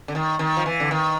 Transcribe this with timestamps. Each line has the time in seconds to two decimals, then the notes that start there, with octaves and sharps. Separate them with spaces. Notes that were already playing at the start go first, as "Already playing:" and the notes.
0.08 D3
0.15 D#3
0.39 D#3
0.57 F3
0.66 E3
0.80 D3
0.91 D#3